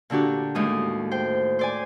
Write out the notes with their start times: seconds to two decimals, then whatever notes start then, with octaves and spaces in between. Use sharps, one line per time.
0.10 A#2 D3 D4 F#4 G4
0.55 D#2 A2 G#3 D#6
1.11 C5 G5
1.59 C5 D5 G#5